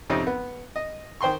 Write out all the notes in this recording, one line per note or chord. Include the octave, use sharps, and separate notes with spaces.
F2 C3 C4 C#4 D#4
B3
D#5
D#3 C5 G5 C6 C#6